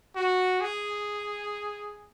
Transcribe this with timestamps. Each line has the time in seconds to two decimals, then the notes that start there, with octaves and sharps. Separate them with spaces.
0.16 F#4
0.61 G#4